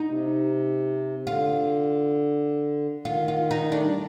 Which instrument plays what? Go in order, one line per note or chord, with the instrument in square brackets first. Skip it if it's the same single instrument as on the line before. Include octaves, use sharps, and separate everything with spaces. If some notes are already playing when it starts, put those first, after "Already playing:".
Already playing: [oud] D#4
[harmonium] C3
[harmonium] D3 [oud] F4
[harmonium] D#3 [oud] F4
[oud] F4
D#4
[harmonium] A3 [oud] D4
[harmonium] G3